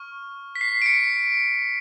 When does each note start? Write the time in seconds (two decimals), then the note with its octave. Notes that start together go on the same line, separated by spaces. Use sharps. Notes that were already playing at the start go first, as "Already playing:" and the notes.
Already playing: C#6 F6
0.55 B6
0.61 C7
0.82 D7
0.86 C#7